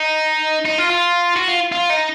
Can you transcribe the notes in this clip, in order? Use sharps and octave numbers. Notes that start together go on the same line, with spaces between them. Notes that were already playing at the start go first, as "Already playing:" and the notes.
Already playing: D#4
D#4
F4
F4
F#4
F4
F4
D#4